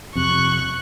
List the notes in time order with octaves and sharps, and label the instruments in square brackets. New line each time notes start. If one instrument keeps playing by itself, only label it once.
[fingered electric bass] F2 C3 [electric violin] C#6 F#6